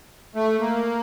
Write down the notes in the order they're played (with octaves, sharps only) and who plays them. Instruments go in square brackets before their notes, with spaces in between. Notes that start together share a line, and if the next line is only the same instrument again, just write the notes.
[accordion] A3
A#3